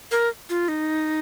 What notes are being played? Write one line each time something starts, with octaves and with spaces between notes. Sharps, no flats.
A#4
F4
D#4